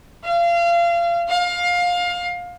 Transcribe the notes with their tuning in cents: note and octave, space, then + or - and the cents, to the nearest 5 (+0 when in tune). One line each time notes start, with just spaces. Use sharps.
F5 -30
F5 +20